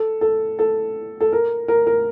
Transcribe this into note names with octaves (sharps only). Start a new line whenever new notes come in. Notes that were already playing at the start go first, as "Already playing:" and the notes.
Already playing: A4
A4
A4
A4
A#4
A#4
A#4